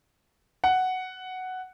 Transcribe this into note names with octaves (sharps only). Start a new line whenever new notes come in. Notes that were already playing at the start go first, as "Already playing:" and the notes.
F#5